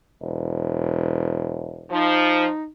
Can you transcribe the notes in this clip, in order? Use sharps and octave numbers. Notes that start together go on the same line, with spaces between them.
E1
F3 D#4